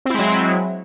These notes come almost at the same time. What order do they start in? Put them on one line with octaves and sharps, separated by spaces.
C4 E4 G#3 F#3